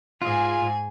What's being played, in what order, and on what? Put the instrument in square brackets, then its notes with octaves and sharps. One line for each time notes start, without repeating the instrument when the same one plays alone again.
[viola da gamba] G#2 [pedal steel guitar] F4 [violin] G#4 G#5